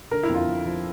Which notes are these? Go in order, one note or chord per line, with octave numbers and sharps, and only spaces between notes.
D3 A#4
E4
F2
F4
F2
F3